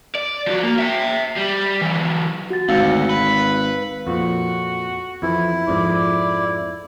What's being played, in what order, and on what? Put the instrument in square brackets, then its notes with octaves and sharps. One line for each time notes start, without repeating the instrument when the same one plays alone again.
[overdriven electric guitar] D5
F3 F#4
A#3
E5 G5
G3
E3 F#3
[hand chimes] F#4 F#5 A6
[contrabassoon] G#1 [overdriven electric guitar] D2 [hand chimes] F5 E6 C#7
[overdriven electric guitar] B4
[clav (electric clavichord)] F2 A#2 [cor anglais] F#4
[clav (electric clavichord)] F2 E3 [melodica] E4
[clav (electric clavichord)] F2 G#2 [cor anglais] D5